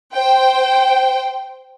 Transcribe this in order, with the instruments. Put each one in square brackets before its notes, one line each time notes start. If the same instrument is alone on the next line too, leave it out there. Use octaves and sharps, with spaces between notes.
[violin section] C5 G5